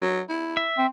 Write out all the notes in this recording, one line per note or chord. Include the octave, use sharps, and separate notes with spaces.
F#3
E4
E5
C4